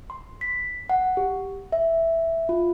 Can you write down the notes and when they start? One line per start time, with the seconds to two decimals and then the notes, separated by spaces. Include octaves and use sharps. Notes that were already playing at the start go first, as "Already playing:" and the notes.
0.10 C6
0.41 B6
0.90 F#5
1.17 G4
1.72 E5
2.49 F4